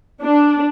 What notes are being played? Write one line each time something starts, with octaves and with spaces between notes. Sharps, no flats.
D4